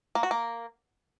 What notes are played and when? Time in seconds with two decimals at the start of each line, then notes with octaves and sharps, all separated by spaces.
0.15 A#3
0.23 F#4
0.31 A#3